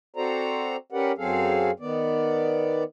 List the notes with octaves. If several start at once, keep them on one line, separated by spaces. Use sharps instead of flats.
C4 F#4 A4 C5 D5 A#5
C#4 G4 A#4 B4 D5 F#5
F#2 F#3 C4 G#4 A4 F5
D#3 B3 D5